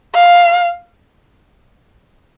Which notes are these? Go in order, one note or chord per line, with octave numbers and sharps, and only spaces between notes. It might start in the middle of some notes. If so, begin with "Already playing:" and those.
F5